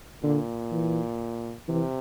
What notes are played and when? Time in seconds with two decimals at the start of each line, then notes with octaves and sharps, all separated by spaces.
0.23 A#2 D3
0.72 E3
1.68 C3 E3